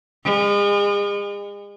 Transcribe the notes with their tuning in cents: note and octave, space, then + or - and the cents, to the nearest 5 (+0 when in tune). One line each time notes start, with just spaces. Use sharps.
G#3 -40